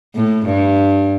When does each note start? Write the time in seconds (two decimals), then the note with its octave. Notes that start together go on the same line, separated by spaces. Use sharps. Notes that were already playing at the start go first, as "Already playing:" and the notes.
0.15 A2
0.45 G2